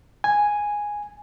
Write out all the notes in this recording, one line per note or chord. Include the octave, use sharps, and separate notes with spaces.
G#5